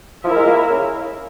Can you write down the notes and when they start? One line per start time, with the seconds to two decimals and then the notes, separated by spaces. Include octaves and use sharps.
0.24 F3 E4 A#4 E5
0.36 G#3
0.47 A#3
0.70 C#3